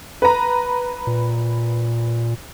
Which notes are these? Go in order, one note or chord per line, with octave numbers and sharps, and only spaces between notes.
B4 A#5
A#2